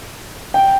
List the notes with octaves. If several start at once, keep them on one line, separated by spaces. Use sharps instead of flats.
G5